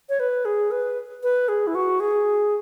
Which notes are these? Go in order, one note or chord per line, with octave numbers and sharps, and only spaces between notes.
C#5
B4
G#4
B4
B4
G#4
E4
F#4
G#4